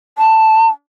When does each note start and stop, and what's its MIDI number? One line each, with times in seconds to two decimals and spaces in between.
0.18 0.67 81